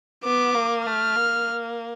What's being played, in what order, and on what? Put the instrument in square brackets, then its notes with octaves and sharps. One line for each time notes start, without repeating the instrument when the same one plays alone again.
[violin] B3 [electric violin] D6
[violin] A#3
[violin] A3 [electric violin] F6
[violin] A#3